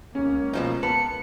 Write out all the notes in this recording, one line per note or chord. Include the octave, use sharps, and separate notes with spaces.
C#2 A#3 C#4
B2 F3 D#4
B3 A5 C#7